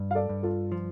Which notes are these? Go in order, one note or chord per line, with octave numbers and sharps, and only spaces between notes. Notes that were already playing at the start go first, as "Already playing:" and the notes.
Already playing: G2
F5
A4 D5
G2
F4 A4
F3